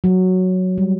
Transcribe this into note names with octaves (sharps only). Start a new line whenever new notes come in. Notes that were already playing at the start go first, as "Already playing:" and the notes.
F#3
G3